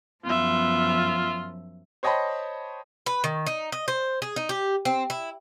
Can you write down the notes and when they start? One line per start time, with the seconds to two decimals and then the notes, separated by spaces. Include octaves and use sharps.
0.25 F#2 F3 B3 F4 E5
2.03 C5 C#5 D#5 G5 A5 B5
3.06 B4
3.24 D#3
3.47 D#4
3.72 D#5
3.88 C5
4.22 G#4
4.36 D#4
4.49 G4
4.85 C4
5.10 E4